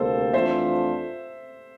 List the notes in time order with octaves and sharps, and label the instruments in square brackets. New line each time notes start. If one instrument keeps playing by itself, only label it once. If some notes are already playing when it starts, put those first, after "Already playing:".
Already playing: [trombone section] D2 C3 G3 A#3 [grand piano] A4 C5
[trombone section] F2 E3 A3 D4 F4 [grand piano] C5 E5